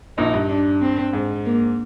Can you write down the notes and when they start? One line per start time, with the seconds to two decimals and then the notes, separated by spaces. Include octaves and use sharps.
0.18 A#1 A#2 D#4
0.34 G2
0.49 D4
0.81 C4
1.13 G#2
1.45 A#3